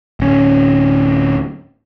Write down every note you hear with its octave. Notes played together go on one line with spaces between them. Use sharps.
D1 C#4